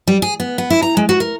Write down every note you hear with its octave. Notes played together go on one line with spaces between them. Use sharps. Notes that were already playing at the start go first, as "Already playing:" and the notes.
G3
G#4
B3
B3
E4
A#5
G#3
F#4
A#4